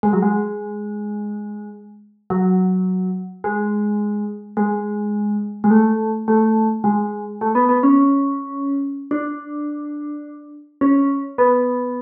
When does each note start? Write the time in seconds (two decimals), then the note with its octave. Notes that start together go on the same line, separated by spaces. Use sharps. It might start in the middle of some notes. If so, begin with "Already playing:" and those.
0.03 G#3
0.13 F#3
0.22 G#3
2.30 F#3
3.44 G#3
4.57 G#3
5.64 G#3
5.70 A3
6.28 A3
6.84 G#3
7.41 A3
7.55 B3
7.69 B3
7.83 C#4
9.11 D4
10.81 C#4
11.38 B3